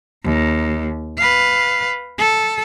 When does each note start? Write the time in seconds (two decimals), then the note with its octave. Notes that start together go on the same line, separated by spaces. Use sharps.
0.24 D#2
1.17 B4 F5
2.18 A4